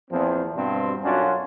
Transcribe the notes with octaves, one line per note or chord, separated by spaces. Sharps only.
E2 A#2 F3 C4
G2 B2 C4
B1 F#2 C#4 D4 F4 F#4